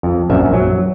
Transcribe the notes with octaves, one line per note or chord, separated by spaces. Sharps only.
F2
A#1 F#2 E5
F#3